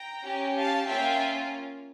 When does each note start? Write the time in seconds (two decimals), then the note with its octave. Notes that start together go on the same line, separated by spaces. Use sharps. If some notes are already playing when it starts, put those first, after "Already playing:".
Already playing: G5 A#5
0.24 C#4 G4
0.55 F5 A5
0.87 A#3 C#4 F4 E5 G5